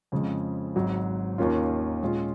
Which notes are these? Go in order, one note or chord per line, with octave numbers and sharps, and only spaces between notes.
F2 C#3 F3 G#3
G#1 G#2 F#3
D#2 D#3 A#3 C#4 F4
A#2 G#3 C#4 F4